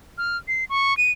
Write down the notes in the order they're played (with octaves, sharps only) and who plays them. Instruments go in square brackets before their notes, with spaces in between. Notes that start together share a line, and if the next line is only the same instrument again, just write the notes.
[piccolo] F6
C7
C#6
D#7